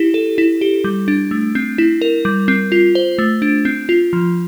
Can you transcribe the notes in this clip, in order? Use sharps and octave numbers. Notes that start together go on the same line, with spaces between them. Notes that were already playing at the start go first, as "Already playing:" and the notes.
Already playing: E4 G4
A4
E4
G4
G3
D4
A3
C4
E4
A#4
G3
C4
F4
C5
A3
D4
C4
F4
F3